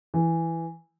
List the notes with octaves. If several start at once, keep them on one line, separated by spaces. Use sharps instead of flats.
E3